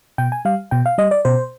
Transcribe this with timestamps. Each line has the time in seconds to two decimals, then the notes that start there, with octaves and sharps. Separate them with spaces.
0.18 B2 G5
0.32 G#5
0.45 G3 F5
0.71 B2 G5
0.86 F5
0.98 G3 D#5
1.11 D5
1.25 B2 C5